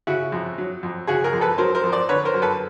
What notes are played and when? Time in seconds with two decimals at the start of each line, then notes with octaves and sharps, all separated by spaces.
0.07 C#3 E4 F#4
0.32 F2
0.58 F#3
0.83 F2
1.07 C#3 F#4 G#4
1.24 G#4 A#4
1.33 F2
1.41 A4 B4
1.58 F#3 A#4 C5
1.75 A#4 C5
1.84 F2
1.92 C5 D5
2.09 D3 B4 C#5
2.25 A#4 C5
2.34 F#2
2.42 A4 B4